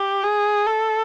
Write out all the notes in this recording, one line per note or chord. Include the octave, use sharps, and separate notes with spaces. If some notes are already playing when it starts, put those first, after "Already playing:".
Already playing: G4
G#4
A4